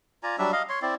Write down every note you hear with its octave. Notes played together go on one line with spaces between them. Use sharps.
F4 D5 G#5 A#5
F#3 G3 D4 E5
D#5 F5
C#5 C6
C4 E4 D5